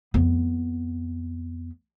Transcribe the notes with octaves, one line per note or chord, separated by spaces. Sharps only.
F2 B3